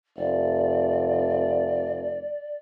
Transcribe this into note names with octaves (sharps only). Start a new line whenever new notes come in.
F1 D5